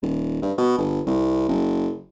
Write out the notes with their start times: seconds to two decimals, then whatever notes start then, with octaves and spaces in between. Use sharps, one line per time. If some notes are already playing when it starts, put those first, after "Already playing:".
0.02 D#1
0.42 G2
0.58 B2
0.78 G1
1.07 C2
1.49 F#1